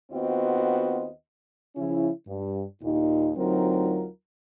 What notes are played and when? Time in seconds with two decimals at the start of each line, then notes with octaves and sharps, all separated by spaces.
0.12 D#2 B3 C4 F4 F#4 D#5
1.76 C#3 F3 C#4 E4
2.27 G2
2.82 D#2 A#2 D#4
3.36 D2 F#3 C4 D#4 F4 A#4